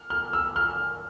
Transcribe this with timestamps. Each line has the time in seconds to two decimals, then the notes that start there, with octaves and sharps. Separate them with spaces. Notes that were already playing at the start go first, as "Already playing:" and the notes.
Already playing: F6
0.10 F6
0.33 E6
0.56 F6